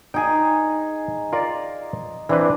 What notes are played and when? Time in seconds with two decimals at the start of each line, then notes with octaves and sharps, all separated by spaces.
0.14 D#4 G#4 G5 G#5
1.33 F4 A#4 D5
2.29 E3 C4 D4 B4